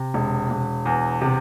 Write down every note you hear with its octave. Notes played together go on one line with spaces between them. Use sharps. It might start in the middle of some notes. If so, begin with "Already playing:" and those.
Already playing: C3
E1
E1
E2
C3